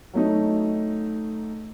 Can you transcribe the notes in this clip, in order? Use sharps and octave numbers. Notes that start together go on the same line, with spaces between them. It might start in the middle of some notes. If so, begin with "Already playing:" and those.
F#3 A3 D#4